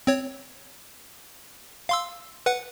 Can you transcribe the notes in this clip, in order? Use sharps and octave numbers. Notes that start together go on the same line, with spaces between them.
C4 C#5
F5 C6 E6
B4 F#5